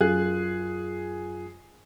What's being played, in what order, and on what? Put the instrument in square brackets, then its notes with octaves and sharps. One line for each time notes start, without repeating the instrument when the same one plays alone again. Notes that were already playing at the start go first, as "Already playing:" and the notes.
[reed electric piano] F#2 F4 F#6 [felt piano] G#4